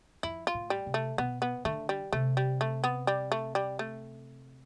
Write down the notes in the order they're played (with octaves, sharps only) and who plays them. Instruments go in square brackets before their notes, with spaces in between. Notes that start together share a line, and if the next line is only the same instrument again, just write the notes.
[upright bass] F2 [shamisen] E4
[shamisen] F4
[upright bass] A2
[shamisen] G3
[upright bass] C3
[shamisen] A3
[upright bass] B2 [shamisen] B3
[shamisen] B3
[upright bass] D3 [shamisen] A3
[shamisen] G3
[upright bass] C3 [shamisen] A3
[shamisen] G3
A3
B3
G3
A3
G3
A3